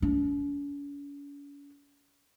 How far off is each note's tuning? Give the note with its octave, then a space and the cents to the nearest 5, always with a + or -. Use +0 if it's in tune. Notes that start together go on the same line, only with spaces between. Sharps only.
C#4 +45